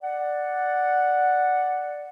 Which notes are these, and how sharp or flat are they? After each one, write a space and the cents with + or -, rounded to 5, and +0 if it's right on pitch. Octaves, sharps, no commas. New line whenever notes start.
D5 +0 F#5 +0